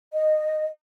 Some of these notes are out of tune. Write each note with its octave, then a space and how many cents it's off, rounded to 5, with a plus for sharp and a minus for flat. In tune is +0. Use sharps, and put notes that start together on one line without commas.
D#5 -10